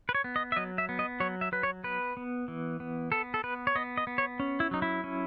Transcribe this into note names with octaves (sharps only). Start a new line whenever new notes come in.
B4
C#5
B3
D#5
E5
F#3 D#5
E5
B3
D#5
F#3 C#5
E5
F#3 B4
C#5
B3 B4
B3
E3
B3
B3 A4
A4
B3 B4
C#5
B3 D#5
D#5
B3
C#5
C#4
E4
F#3 D#4
E4
C#4